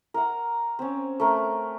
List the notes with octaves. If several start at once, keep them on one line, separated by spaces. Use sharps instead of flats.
A#4 F#5
C4 C#4
A3 A#4